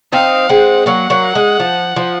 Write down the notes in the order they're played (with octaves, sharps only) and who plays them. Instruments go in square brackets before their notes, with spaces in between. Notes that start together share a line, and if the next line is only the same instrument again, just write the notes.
[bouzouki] C4 D#4 [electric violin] F5
[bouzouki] G#3 C4 [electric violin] F#5
[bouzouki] F#3 A#3 [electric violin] F#5
[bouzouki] F#3 A#3
G#3
F3
F3